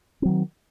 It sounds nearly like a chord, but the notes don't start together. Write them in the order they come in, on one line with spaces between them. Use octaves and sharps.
C4 F#3 D#3